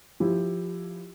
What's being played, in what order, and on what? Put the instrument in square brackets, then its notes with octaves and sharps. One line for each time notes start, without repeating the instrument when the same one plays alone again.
[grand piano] F3 E4 G4